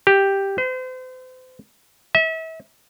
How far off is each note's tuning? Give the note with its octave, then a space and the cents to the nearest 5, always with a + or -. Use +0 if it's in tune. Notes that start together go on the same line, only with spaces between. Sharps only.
G4 +0
C5 -35
E5 -35